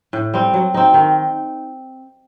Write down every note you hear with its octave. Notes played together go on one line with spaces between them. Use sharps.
A2
G3 C4
F#3
C4 D#4
D#3